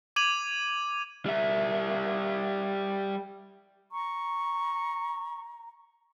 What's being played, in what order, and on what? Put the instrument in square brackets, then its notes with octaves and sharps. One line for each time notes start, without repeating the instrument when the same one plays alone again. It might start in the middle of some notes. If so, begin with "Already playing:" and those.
[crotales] D6 G#6 D#7 F7 F#7
[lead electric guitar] G3 E5
[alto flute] A#5 [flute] C#6